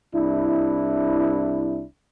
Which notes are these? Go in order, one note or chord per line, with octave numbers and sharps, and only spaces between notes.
C2 D4 E4